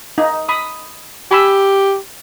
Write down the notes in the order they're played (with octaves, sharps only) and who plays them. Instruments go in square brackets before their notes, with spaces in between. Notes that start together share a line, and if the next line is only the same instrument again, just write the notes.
[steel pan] D#4
B5 D#6
[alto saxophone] G4 [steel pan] G#5 B5 E6